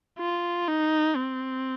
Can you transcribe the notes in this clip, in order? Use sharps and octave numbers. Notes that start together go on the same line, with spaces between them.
F4
D#4
C4